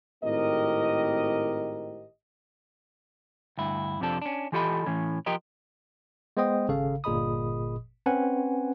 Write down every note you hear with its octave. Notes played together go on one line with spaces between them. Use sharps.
G#1 A2 C4 G4 A#4 D#5
D2 G2 E4
F2 C3 F3 D4 A4
C#4 D4
E3 F4 G4 A4 D#5 B5
A2 E3 C#4
F3 G4 A#4 D#5
G#3 B3 C5 D#5 G5 D#6
G#1 C#3 A4 F5
G1 A#2 G#4 D#5 B5 D#6
C4 C#4 B4 F#5 G#5